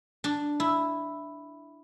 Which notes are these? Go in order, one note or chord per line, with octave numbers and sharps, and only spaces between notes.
D4
E4